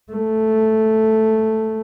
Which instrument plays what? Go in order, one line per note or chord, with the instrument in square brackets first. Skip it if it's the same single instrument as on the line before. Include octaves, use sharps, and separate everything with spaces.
[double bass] A3